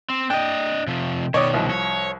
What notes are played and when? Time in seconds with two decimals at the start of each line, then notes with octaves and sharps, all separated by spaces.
0.10 C4
0.30 D4 D#5 G5
0.87 C3 F3
1.34 B2 D#3 C#5 D5 D#6
1.54 C2 F3
1.69 C#5